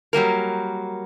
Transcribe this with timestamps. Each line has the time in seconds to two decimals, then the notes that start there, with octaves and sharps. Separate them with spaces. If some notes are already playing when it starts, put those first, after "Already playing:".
0.13 F#3 G3 A#3 A#4